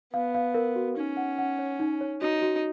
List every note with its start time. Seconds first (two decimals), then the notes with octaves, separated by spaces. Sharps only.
0.13 B3 F5
0.35 F5
0.54 A#4
0.76 F#4
0.97 C#4 D#4
1.17 F#5
1.38 F#5
1.59 C#5
1.80 D#4
2.01 C#5
2.21 D#4 F#4
2.42 F#4